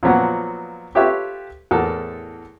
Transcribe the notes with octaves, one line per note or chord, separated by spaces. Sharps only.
A#2 F3 F#3 B3
F4 G4 A4 B4 C#5 E5
E2 A2 A4 A#4